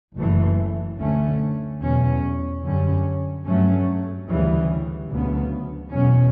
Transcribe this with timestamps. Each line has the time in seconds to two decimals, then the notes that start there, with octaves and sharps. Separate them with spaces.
0.16 F#1 F#2 E3 A3
0.97 D2 D3 A3 C#4
1.80 E2 B2 F#3 C#4
2.62 F#2 D3 G3 C#4
3.44 G2 F#3 A3 C#4
4.27 D2 C#3 E3 G3
5.09 D2 C#3 F#3 B3
5.91 E2 B2 F#3 C#4